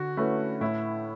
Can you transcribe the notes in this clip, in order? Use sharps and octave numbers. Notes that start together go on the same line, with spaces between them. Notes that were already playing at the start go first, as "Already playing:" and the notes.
Already playing: D3 F#4
A3 C#4 E4 B4
A2 E4